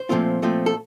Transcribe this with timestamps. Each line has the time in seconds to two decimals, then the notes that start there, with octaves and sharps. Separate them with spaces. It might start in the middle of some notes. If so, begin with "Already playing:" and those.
Already playing: C5
0.09 A#2 F3 A3 C4 F4
0.42 A#2 F3 A3 C4 F4
0.66 A4